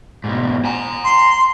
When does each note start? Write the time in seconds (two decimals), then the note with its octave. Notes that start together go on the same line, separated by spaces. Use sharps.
0.24 G#2 B2
0.65 G#5 A#5
1.03 C6